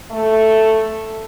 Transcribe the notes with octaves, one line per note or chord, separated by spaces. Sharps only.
A3